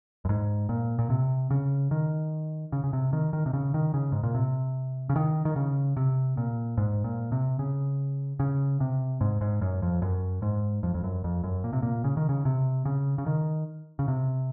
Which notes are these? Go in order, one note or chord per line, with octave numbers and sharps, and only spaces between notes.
F#2
G#2
A#2
A#2
C3
C#3
D#3
C#3
C#3
C3
D#3
D#3
C3
C#3
D#3
C#3
G#2
A#2
C3
C#3
D#3
D#3
C#3
C3
A#2
G#2
A#2
C3
C#3
C#3
C3
G#2
G#2
F#2
F2
F#2
G#2
F2
F2
F#2
F2
F#2
A#2
C3
A#2
C#3
D#3
C#3
C3
C#3
C#3
D#3
C#3
C3